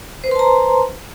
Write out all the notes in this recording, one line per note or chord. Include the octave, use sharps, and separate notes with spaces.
B4 C5 A5 A#5 C6